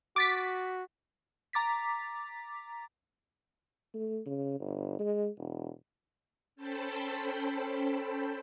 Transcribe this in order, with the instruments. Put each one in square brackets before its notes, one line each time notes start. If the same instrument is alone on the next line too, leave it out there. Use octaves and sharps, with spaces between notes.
[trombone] F#4 [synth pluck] D6 A6 B6
[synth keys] A#5 D6 A6 B6
[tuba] A3
C#3
G1
G#3
E1
[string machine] C#4 A4 C5 G5 A5 B5